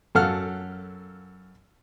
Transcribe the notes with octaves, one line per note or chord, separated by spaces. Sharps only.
F#2 A4 F5 F#5 F6